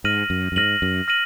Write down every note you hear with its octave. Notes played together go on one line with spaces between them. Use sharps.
G#2 F6 A#6 D#7 F#7
F#2
F#2
G#2 F6 A#6 D#7 F#7
F#2
F6 A#6 D#7 F#7